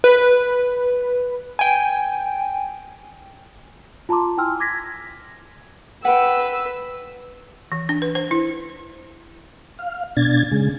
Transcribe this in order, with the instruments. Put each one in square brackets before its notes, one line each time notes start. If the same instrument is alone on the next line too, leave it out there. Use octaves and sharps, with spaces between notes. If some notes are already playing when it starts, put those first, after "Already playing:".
[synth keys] B4
G5 G#5
[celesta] F4 A5 A#5 C6 D6
E4 G5 G#5 C6 E6 F6
D6 G#6 A#6 B6
[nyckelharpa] B4 [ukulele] F#5 G5 [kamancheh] E6
[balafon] E3
D4
B4
C5
E4
[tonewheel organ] F5
B2 D4 G#6 A6
C#3 G#3